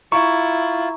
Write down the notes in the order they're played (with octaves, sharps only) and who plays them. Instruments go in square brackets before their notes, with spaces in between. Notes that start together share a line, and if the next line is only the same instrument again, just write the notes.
[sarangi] E4 [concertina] F4 [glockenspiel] A#5 [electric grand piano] C#6